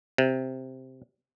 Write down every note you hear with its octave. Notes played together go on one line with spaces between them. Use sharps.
C3